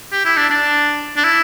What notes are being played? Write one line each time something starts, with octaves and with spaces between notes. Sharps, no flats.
G4
E4
D4
D4
D4
E4